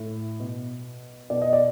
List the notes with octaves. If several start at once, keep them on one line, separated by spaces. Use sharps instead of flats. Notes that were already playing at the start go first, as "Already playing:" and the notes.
Already playing: A2
B2
B2 D5
D#5
D5